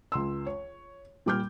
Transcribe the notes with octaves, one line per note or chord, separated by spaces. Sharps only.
C#2 C6 E6
C#5
A#2 G3 D6 F6 G6